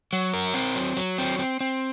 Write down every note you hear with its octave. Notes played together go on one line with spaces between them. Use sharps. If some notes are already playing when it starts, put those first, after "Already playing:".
F#3
A#4
C4
F#3
F#3
C4
C4
C4